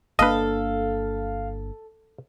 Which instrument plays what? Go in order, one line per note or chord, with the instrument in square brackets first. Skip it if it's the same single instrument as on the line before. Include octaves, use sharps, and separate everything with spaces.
[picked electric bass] G1 A#3 D4 [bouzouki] A4 [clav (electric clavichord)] B4 D#5 [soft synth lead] F5